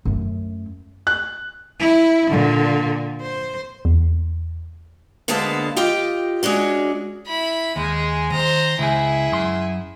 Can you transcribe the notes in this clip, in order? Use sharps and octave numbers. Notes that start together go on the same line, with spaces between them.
F#2 A3
F#6
E4
A#2 D3
C5
E2
D2 D3 G#3 A#3 B3 A5
F4 G4 D#5 G5
G#3 C#4 D4 F#4
E4 B5
D#2 G#3 G#4
D#3 C5 A#5
C#2 E4 G#4 G#5
F#2 C6